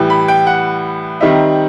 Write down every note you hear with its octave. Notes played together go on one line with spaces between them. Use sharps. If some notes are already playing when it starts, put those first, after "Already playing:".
Already playing: A2 E3 G3
B5
G5
F#5
D#3 G3 C4 D#4 E5